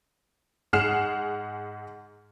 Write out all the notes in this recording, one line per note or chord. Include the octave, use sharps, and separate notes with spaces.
G#2 G#4 F#5 F6 C7 E7